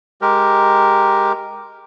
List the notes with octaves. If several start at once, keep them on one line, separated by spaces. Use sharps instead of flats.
G#3 G4 A#4